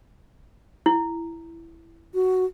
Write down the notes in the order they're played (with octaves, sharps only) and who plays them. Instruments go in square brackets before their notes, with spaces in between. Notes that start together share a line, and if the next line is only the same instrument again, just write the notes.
[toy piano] E4
[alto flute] F#4